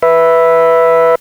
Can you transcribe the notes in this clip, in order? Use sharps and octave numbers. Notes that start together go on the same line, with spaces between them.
B4 E5